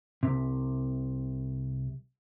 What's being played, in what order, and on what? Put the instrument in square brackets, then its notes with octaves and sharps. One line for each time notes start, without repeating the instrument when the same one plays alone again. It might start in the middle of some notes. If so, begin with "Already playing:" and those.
[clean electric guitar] C2 C3